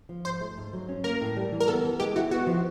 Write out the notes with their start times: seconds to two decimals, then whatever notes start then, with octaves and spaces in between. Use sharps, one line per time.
0.09 F3
0.25 G#2 C5
0.41 A3
0.58 G#2
0.73 F#3
0.89 C#4
1.04 A#3 A#4
1.21 A2
1.37 G3
1.52 E3
1.60 A#4
1.68 B3 A4
1.85 E3
2.00 G#3 G4
2.16 E4 F#4
2.31 B3 F#4
2.47 F3